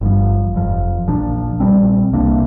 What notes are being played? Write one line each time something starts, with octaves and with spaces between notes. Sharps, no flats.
G1 G2 F3
F1 F2 F3
A#1 A#2 F3 D4
A#1 A#2 G3 C4
C2 C3 A#3 D4